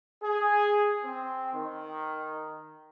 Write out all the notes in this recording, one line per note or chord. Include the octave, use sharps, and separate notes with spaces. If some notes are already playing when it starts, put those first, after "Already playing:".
G#4
C4
D#3